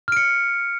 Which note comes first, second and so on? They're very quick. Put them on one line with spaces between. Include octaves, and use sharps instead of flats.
F6 D7 C#7